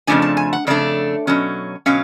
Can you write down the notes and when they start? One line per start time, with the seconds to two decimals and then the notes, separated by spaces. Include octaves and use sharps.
0.07 F2 C#3 F3 A3 D4 G#5
0.22 A5
0.37 G#5
0.53 F#5
0.67 F2 C#3 A3 D4 D5
1.27 B2 F#3 C#4
1.86 B2 F#3 C#4 F5